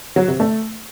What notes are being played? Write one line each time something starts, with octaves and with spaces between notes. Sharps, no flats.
F#3
C3
A3